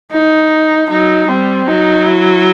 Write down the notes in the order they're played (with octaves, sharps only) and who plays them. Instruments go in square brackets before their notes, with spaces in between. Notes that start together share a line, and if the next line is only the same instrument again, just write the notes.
[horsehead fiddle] D#4
[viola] F#3 [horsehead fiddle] D#4
[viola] G3 [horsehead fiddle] C4
[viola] F#3 [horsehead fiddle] D#4
[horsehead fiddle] E4